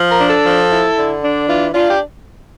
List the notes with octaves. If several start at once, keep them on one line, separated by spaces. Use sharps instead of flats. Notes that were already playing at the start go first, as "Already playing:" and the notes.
Already playing: F3
A#4
D4
A4
F3
E4
D3
D4
E3 F4
D4 F4
G4